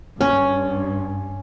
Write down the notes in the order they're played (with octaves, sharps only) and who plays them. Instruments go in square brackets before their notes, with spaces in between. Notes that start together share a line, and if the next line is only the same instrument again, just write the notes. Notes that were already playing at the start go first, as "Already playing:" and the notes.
[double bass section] G2 [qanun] C#4